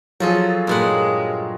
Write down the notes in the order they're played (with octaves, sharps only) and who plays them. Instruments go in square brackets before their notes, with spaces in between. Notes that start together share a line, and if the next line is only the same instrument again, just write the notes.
[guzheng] F3 A4 D#5 [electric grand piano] F#3 F4 G#4
[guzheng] G2 A#2 F#5 [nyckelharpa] G#3